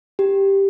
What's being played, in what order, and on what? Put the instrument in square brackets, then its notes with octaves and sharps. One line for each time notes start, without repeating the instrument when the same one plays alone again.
[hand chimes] G4